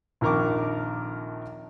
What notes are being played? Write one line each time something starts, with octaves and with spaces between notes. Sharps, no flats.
A#1 F2 D#3 A#4 C#6 D6